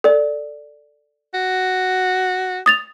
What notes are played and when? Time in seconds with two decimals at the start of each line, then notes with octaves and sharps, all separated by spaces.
0.04 A4 D5
1.34 F#4
2.66 D#6 A6 F7